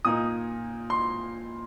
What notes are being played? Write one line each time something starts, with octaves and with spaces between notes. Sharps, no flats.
A#2 A#3 D#4 D#6
C6